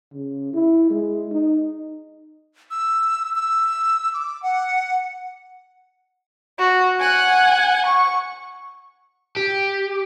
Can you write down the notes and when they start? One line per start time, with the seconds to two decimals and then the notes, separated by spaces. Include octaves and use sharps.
0.13 C#3
0.53 E4
0.90 G#3
1.31 D#4
2.71 E6
3.36 E6
4.13 D6
4.43 F#5
6.59 F#4
7.00 F#5 G#5
7.86 C#6
9.36 G4